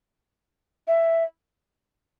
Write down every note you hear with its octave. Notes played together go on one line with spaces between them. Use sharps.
E5